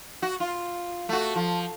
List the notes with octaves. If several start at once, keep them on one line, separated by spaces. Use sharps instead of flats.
F#4
F4
A3 F#4
F3